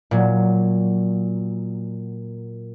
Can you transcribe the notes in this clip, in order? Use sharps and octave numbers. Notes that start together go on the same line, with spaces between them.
A#2 F#3